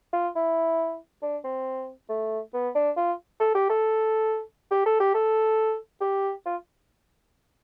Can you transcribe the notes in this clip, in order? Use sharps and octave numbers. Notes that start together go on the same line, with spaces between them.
F4
E4
D4
C4
A3
B3
D4
F4
A4
G4
A4
G4
A4
G4
A4
G4
F4